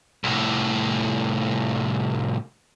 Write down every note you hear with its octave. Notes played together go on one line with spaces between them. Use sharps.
C2 A2